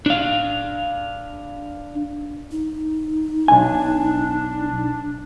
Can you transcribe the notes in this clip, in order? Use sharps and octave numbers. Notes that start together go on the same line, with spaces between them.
D4 F5
D#4
B1 D4 G#5